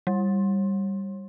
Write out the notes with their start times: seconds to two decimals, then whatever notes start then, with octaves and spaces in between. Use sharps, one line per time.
0.07 G3